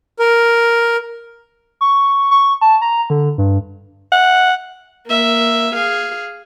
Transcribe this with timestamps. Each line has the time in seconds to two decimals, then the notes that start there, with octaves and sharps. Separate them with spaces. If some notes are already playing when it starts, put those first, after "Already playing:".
0.19 A#4
1.81 C#6
2.31 C#6
2.61 A5
2.82 A#5
3.10 D3
3.38 G2
4.12 F#5
5.08 A#3 E5
5.75 G#4 F5